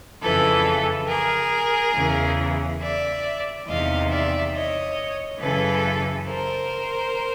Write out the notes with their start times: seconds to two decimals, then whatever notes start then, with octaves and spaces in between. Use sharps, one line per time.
0.22 F2 C#3 E3 A4 B4
1.08 G#4 A#4
1.95 E2 C#3 E3
2.81 D5 E5
3.67 E2 C3 D#3 D#5 F5
4.10 D5 E5
4.54 C#5 D#5
5.40 F#2 C#3 E3 A4 B4
6.26 A#4 C5